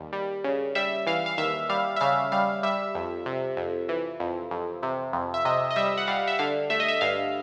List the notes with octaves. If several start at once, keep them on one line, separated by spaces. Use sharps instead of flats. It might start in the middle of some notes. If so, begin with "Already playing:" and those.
Already playing: D#2 G3
G3
C#3
G3 E5
E3 F5
F5
D#2 E5
G3 F5
E5
C#3 F5
G3 F5
G3 E5
F2
C3
F2
E3
F2
F2
C3
F2
E5
C3 D#5
D#5
G3 E5
F#5
G3 F5
E5
D3 F5
A3 E5
D#5
E5
G2 F5